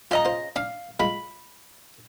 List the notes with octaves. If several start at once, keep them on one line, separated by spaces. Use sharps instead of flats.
C#3 F4 D#5 G#5 A#5 D#6
F4 C5
D4 F5
G#3 F4 B5